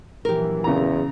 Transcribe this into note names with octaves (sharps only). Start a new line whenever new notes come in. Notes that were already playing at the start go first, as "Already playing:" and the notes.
A#1 E3 F#3 G4 A#4
E2 C#3 A#5